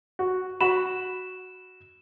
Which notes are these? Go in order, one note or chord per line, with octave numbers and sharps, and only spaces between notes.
F#4
F#4 B5 E7